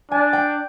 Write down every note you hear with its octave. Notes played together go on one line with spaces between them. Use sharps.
D4 G#5
G5